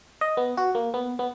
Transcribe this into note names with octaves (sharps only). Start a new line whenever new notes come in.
D#5
B3
F#4
A#3
B3
B3